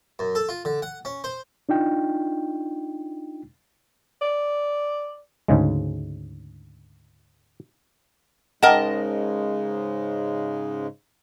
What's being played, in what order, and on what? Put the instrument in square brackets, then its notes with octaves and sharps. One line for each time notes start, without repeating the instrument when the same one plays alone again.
[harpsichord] F#2
A4
F4
D3
F#5
C#4
C5
[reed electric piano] D4 D#4 F4 G5
[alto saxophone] D5
[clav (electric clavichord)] D2 G#2 C#3 G#3
[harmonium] G#2 C#3 G#3 [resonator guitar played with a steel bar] A#4 D#5 A5 [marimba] F#5 G5